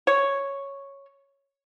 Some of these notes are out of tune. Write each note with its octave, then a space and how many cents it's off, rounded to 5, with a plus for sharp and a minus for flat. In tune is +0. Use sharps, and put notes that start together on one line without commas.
C#5 +0